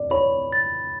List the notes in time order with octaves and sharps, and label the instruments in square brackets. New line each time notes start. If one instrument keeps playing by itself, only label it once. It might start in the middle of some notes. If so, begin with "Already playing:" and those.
Already playing: [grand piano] D5
[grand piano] C#5 [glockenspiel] B5
[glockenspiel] A6